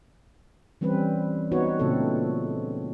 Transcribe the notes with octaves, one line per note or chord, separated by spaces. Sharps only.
E3 G3 C4 C#4 B4
B3 D#4 F#4 B4 C#5
A#2 C#3 A3 C4 A4